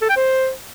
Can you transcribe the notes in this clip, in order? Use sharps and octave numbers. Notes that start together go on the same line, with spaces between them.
A4
G5
C5